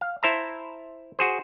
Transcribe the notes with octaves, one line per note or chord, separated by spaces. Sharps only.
F5
E4 C5 E5 A5 A#5
F#4 G#4 C5